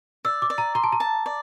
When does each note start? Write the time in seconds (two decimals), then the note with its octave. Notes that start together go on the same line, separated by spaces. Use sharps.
0.25 D5 E6
0.42 D6
0.50 D5
0.58 A#5
0.75 A#5 C6
0.84 A5
0.93 A#5
1.00 A5
1.26 D5